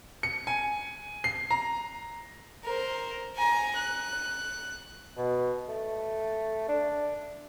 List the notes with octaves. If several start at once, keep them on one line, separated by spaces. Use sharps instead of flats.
C#7
G#5
C7
A#5
A#4 C5
G#5 A#5
F#6
B2
A3
D4